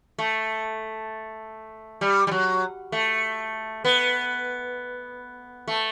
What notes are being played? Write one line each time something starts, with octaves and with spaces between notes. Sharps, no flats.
A3
G3
G3
F#3
A3
B3
A3